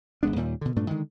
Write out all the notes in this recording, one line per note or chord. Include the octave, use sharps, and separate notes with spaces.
G#1 G#3 B3 D4
D#2 A#2 G3
B2 D3
G2 A#2 A3 D4
D3 D#3 G#3